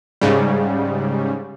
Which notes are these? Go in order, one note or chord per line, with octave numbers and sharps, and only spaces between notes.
G#2 C#3 G3